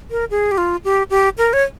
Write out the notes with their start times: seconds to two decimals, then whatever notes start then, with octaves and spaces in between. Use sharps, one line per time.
0.11 A#4
0.31 G#4
0.51 G4
0.58 F4
0.84 G4
1.10 G4
1.38 A#4
1.53 C#5